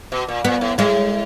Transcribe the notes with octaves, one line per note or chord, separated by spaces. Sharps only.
B2
A#2
A#2 B3
A2
A2 G#3